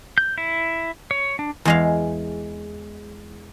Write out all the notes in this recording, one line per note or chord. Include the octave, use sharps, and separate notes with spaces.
G6
E4
C#5
D4
E2 G#3 F5